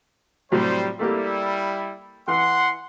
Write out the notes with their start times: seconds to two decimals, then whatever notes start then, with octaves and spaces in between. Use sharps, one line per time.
0.52 A2 C3 F#3 G3 C5
0.99 G3 A3 A#3 E4 G4
2.28 E3 F#5 C6